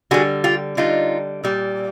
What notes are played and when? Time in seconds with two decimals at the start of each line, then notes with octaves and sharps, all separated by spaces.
0.11 D3 G3 F#4 G#4
0.44 F4 G4
0.77 D3 G3 D#4 F4
1.43 A#2 G3